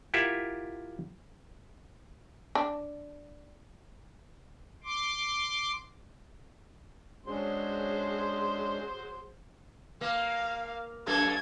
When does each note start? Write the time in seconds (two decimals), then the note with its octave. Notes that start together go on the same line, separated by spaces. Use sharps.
0.14 E4 F4 G4 A#4 E5 F#5
2.55 D4
4.84 C6 D6
7.26 F#3 G#3 C#4 D4 G#4 C5 C6
10.01 A#3 F5
11.07 F#2 A#3 A4 G#6